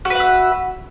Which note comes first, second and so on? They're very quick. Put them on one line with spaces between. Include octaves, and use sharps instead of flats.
F#4 B4 F#5 E5